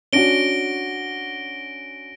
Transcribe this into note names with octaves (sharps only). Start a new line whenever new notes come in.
C#4 D4 F#4 A#6 D7 G7